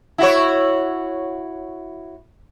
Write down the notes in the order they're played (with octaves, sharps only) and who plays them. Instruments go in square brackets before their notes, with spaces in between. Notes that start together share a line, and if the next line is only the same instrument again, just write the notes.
[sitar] E4 F#4 C#5